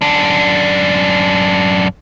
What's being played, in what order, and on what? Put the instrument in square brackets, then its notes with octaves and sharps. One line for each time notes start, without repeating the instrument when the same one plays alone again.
[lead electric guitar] F#2 D4